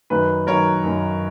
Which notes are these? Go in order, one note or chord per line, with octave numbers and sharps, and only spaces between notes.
F#2 D#3 F#3 B4
F#2 D#3 F#3 A#4 C#5
F#2 D#3 F#3